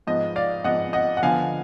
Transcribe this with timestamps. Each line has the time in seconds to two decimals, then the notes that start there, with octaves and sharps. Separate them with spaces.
0.07 G#2 F3 B3 D#5
0.36 D5 F5
0.64 G#2 F3 B3 D#5 F#5
0.93 D#5 F#5
1.17 F#5
1.22 D3 F3 B3 F5 G#5